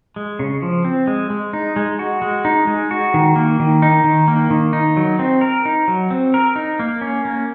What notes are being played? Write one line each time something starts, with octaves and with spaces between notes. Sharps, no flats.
G#3
C#3
F3
C4
G#3
G#3
D#4
G#3
F#4
G#3
D#4
G#3
F#4
D#3
A#3
D#3
D#4
D#3
A#3
D#3
D#4
F#3
C4
A#4
D#4
F#3
C4
A#4
D#4
A#3
C#4
A#3